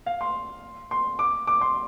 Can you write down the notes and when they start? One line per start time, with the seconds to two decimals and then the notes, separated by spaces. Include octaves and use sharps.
0.06 F5
0.21 C6
0.91 C6
1.19 D6
1.47 D6
1.61 C6